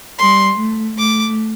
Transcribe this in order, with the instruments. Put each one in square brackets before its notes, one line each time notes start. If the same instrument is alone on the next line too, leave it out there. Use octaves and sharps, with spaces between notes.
[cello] G3 [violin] C6
[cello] A3
[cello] A3 [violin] D6